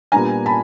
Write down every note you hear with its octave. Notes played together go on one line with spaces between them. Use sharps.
A#2 G3 B3 D4 G#5 A#5
A5 B5